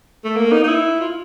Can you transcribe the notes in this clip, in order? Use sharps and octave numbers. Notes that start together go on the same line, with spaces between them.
A3
A#3
D#4
D#4
E4
F4